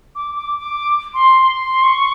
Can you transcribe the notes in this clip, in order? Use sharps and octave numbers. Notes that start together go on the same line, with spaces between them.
D6
D6
D6
C6
C6
C#6